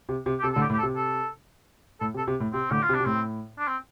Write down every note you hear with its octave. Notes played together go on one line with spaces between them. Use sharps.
C3
C3
G4
C3 A4
A4
A2 D3
G4
A2
G4
A4
C3
A4
A2 A4
C3
A4
C3
A2
C3 C4
A2 D3 G4
F4
C3
D4
C3
A2 C4
D4
C4